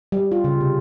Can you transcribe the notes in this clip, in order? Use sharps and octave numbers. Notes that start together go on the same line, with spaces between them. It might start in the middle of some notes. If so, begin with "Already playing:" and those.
G3
F4
C#3
C3